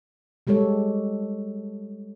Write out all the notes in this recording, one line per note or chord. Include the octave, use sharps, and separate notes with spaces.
G3 G#3 G4 A4 C#5